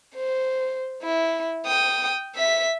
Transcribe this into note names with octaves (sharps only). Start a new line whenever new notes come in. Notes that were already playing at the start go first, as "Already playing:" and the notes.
C5
E4
G5 D#6
E5 B6